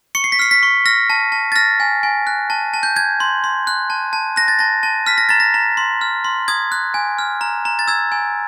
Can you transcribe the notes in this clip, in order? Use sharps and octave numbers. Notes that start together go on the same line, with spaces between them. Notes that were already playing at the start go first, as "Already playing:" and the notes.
C#6 C#7
C7
B6
F6 C7
B6
C#6
F6 A#6
A5
A5
A6
F6 A#6
G#5
G#5
F#6
A5
A5
G6
G6 G#6
C6
C6
F#6
A5
A5
F#6 A#6
A6
A5 A#6
A5
F6 B6
A#6
A#5 A6
A#6
A#5
C6
F6
C6
D#6 G#6
F#6
G#5
F6
A#5
A#5
A6
E6 G#6
G#5